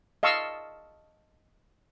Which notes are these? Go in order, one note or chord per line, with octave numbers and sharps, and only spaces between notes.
D#5 F5 A5 C#6 E6